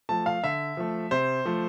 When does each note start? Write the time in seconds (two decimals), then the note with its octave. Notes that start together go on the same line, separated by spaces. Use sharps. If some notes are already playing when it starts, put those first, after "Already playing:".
0.09 F3 A3 A5
0.26 F5
0.44 D3 E5
0.77 F3 A3
1.11 C3 C5
1.46 F3 A3